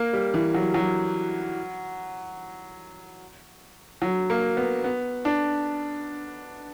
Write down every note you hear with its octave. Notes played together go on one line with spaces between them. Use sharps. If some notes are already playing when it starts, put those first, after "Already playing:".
Already playing: A#3
G3
E3
F#3
F#3
F#3
A#3
B3
B3
D4